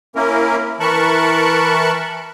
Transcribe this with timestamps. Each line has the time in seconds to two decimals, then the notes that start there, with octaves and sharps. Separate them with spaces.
0.16 A#3 C#4 E4 A#4
0.80 E3 A#4 A5 B5 C#6 F#6